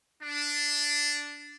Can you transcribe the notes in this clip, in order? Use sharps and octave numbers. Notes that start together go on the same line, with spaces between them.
D4